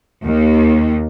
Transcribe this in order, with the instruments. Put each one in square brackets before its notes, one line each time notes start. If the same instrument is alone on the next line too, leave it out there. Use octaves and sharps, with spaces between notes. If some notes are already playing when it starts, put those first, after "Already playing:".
[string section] D#2